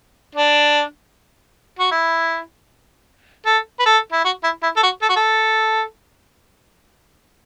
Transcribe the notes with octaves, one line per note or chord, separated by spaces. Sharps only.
D4
F#4
E4
A4
B4
A4
E4
F#4
E4
E4
A4
F#4
A4
F#4
A4